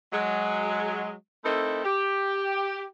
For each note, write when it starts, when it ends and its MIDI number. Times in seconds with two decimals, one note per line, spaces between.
0.13 1.12 54
0.13 1.12 56
1.45 1.85 57
1.45 1.85 60
1.45 1.85 63
1.45 1.85 64
1.45 1.85 69
1.45 1.85 70
1.85 2.84 67